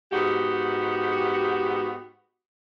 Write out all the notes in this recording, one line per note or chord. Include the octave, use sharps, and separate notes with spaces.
G#2 B3 F#4 G4